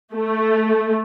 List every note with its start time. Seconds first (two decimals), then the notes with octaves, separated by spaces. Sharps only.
0.14 A3